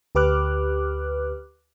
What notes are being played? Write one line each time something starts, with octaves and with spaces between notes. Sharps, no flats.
D2 G4 B4 D6 F6 F#6